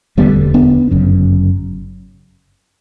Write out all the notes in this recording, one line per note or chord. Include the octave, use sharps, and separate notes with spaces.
E1 D2 D3 G3 B3
B3 D4
G1 F#2 C#3